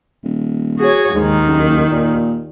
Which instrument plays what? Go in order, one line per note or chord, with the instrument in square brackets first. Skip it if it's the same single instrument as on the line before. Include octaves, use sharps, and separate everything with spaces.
[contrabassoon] D#1
[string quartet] F#4 G#4 C#5
[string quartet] D#2 D#3 [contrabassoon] G#2
[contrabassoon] F#1
A#2